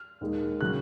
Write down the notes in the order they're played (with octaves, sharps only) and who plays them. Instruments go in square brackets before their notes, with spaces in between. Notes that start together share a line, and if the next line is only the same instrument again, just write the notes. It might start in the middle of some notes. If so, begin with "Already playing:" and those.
Already playing: [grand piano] F6
D#2 D#3 G#3
C#3 F#3 F#6